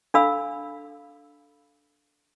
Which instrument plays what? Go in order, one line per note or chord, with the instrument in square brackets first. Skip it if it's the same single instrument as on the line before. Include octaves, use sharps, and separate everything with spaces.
[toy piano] D4 A4 F5 B5 E6